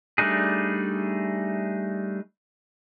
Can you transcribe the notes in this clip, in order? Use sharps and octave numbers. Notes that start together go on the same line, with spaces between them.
G3 A3 D4 D#4 G#4